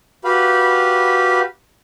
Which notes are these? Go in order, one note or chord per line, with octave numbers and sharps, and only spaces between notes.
F#4 G4 B4 F5 B5